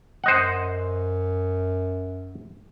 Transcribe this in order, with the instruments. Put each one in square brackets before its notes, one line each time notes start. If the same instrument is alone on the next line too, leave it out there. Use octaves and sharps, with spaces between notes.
[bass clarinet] F#2 [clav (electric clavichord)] C5 D#5 F#5